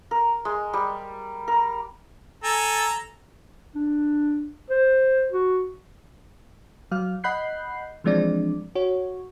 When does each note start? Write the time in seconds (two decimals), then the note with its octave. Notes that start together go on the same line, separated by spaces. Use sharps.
0.11 A#4
0.45 G#3
0.73 G3
1.48 A#4
2.44 A4 G#5 A#5
3.75 D4
4.70 C5
5.32 F#4
6.91 F#3 F5 F6
7.24 D#5 F#5 B5 F#6 G6 C7
8.04 E3 F3 G#3 C4 D4 D5
8.75 F#4 C#5